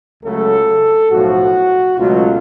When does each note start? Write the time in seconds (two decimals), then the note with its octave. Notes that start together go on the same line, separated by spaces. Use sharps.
0.23 C#2 C#3 F#3 A3 A4
1.10 B1 A2 F3 F#4
1.97 C#2 B2 F#3 A3 F4